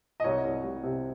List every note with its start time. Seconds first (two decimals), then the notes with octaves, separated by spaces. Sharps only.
0.20 D#5
0.24 C2 C#5
0.45 C2
0.64 G3
0.83 C3